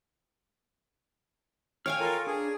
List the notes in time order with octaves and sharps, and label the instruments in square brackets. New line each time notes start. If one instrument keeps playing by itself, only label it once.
[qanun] C#5 F5 G#5 [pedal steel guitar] G5 F6
[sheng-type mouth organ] F4 A4 A#4
[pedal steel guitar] D4 [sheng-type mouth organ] G#4